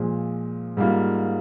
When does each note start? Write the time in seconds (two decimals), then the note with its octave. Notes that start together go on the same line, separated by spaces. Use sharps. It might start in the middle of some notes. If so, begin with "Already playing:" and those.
Already playing: A#2 F3 G#3
0.77 G#2 G3 A#3 F4